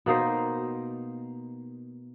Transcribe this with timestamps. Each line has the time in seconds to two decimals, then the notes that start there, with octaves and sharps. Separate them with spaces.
0.06 B2 A#3 D#4 C5